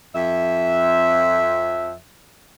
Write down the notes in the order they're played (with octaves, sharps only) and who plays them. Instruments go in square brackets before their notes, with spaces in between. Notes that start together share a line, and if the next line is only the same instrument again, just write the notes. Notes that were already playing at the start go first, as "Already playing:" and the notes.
[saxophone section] F2 E5